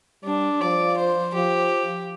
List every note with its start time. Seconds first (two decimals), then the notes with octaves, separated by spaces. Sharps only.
0.24 G3 D4
0.61 F3 D5
0.98 C5
1.35 F3 G4